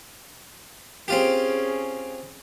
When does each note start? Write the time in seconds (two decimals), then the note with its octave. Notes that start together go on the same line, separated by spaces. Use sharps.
1.08 C4 C#4 F4 G4 G#4